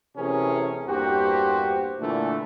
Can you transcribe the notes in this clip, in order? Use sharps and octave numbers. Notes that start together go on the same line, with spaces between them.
C3 E3 A3 C#4 G#4 A#4
E2 G2 A#3 F#4 G4 C5
A#2 D3 E3 A3